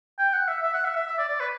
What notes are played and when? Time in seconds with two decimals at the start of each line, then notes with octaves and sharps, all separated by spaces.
0.19 G5
0.33 F#5
0.48 E5
0.63 E5
0.74 F#5
0.85 E5
0.96 E5
1.07 E5
1.18 D5
1.29 D5
1.40 B4